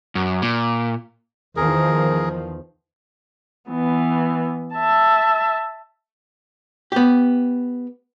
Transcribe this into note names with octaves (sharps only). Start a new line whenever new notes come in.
F#2
A#2
E2 D#3 F3 G#4 A#4
E3 B3
E5 A5
B3 G4